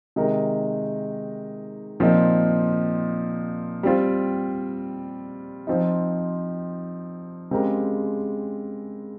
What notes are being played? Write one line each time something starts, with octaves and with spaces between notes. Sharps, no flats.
C3 D#3 G#3 D#4 A#4
A#2 F3 C4 D#4
G3 C4 F4
F3 C4 D#4
C#3 G#3 C4 G4 A#4